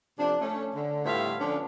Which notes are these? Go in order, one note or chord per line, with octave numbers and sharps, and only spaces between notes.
C3 F3 A3 D4
A3 C#4
D3
A2 G3 B3 F4 E5 F5
D3 F3 B3 C#4 D4